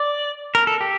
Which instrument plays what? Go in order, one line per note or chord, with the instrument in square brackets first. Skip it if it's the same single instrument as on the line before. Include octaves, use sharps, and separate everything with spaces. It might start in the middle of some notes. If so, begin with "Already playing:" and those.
Already playing: [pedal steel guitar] D5
A#4
A4
G4